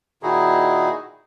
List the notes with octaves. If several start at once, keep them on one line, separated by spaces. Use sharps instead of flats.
A#2 D#3 D#4 E4 F#4 G#4